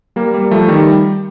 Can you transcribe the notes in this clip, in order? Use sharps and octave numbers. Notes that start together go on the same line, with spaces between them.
G3 A#3
G3 A#3
F3 A3
D#3 G3